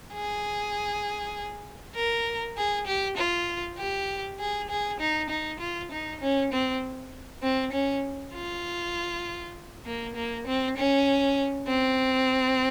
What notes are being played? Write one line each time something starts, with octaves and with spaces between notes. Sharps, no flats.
G#4
A#4
G#4
G4
F4
G4
G#4
G#4
D#4
D#4
F4
D#4
C#4
C4
C4
C#4
F4
A#3
A#3
C4
C#4
C4